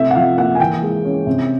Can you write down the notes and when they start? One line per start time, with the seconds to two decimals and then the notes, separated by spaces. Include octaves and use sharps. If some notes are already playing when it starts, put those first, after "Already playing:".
Already playing: C3 A3 E5
0.11 F#5
0.15 F3 F5
0.37 A#3 F#5
0.55 G#5
0.60 E3 G5
0.82 G#3
1.04 C#4
1.26 C3